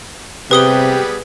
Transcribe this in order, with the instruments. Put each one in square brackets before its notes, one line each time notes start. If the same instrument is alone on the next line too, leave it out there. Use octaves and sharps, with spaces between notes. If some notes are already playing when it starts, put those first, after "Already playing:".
[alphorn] C3 [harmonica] G3 B3 G#4 [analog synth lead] G4 [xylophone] B4 D#6 G7